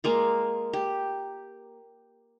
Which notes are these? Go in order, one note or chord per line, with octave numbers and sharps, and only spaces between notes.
G#3 A#3 F4
G4